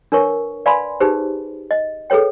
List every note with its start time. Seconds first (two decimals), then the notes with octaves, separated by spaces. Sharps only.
0.12 D4 A#4 B4 C#5 C#6
0.66 B4 D5 F5 G#5 B5 C6
1.00 D#4 G4 G#4 B4 C5
1.71 D#5
2.10 G#4 A4 B4 C#5 G5